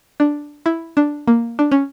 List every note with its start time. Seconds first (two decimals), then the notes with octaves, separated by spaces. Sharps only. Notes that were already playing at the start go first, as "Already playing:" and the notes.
0.20 D4
0.66 E4
0.97 D4
1.27 A#3
1.59 D4
1.71 C#4